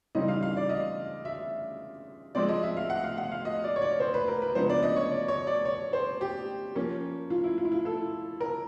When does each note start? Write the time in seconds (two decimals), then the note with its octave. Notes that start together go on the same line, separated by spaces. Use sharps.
0.15 C#3 E3 G3 C4 D#4 D#5
0.28 F5
0.43 F5
0.57 D5
0.69 D#5
1.25 E5
2.35 F3 G#3 C4 D5
2.48 D#5
2.63 E5
2.77 F5
2.90 F#5
3.04 F5
3.18 F#5
3.32 F5
3.45 D#5
3.64 D5
3.76 C#5
3.82 D5
4.00 C5
4.14 B4
4.28 A#4
4.42 B4
4.55 C#3 F3 G#3 B3 D4 C5
4.70 D5
4.83 D#5
4.96 C#5
5.11 D5
5.28 C#5
5.47 D5
5.65 C#5
5.93 C5
6.21 G4
6.75 F3 A#3 C#4
7.30 F4
7.44 E4
7.58 F4
7.65 E4
7.72 F4
7.85 A4
8.41 A#4